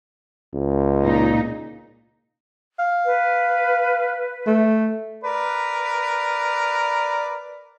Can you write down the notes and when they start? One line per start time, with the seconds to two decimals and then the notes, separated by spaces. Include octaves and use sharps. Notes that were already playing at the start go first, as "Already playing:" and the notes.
0.54 C#2
1.03 A#2 D#4
2.79 F5
3.05 B4
4.47 A3
5.24 A#4 B4 D5